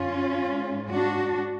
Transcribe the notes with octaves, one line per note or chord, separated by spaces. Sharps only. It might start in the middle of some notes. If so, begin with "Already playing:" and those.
Already playing: F#2 D3 C#4 F4
G#2
D4 F#4